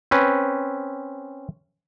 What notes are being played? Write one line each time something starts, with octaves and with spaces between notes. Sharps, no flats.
C4 C#4 B4